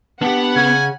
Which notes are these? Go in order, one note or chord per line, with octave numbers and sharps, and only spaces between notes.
B3 D4 G4 F#5
C#3 C#4 G#5